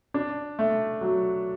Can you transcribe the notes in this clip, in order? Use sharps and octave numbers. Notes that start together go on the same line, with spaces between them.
D4
A3
F#3